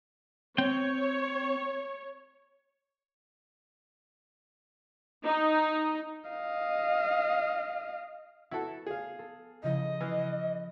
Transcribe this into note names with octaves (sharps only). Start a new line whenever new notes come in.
C4 C#5 G5
D#4
D#5 F5
B3 E4 F#4 A4
G#4 F5
A4
C#3 F3 E4 D#5
E3 F6 C7